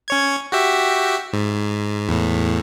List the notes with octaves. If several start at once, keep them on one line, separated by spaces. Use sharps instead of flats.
C#4 C#5 G#6
F#4 G4 E5
G#2
E2 A2